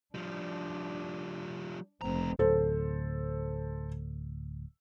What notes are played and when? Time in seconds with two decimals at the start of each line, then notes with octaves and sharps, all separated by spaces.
0.15 F3 G3 D4
2.01 F1 C#2 C4 A#5
2.39 D1 A4 C5